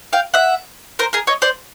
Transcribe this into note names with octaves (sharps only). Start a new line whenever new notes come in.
F5 G5
E5 F#5
A#4 C5
G#4 A#4
C#5 D#5
C5 D5